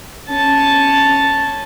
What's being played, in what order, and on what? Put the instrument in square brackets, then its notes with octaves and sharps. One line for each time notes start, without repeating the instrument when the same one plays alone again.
[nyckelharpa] C#4 A5